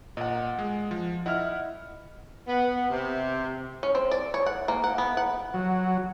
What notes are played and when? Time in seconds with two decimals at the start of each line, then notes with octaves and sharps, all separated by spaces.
0.17 A#2 D#5 F#5
0.59 G#3
0.91 F3
1.26 E4 D#5 E5 F#5 F6
2.47 B3
2.90 C3
3.83 C#4
3.95 C4
4.11 D5
4.34 C#5
4.46 F#5
4.68 A#3
4.84 F#5
4.98 B3
5.17 F#5
5.54 F#3